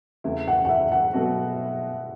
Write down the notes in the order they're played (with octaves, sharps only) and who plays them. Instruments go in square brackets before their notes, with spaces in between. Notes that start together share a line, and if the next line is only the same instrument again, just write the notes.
[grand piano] E2 C#3 E3 A3 E4
[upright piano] F#5
F#5
E5
F#5
[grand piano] B2 F#3 B3 F#4 A4